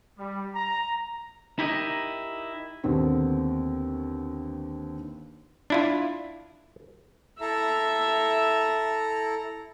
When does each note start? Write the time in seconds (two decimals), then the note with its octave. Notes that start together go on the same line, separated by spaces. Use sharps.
0.17 G3
0.55 A#5
1.59 D#4 E4 G4 A#4 C#5 D#5
2.84 D#2 D3 D#3 B3 C4
5.70 D4 E4 F4
7.41 E4 A4 E5 A#5